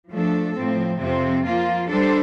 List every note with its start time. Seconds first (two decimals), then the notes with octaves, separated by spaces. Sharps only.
0.11 F3 A3 D4 A4
0.56 A2 F3 C4
1.00 F2 C3 F3 C4
1.45 F3 A#3 F4
1.89 G3 D4 A4 C5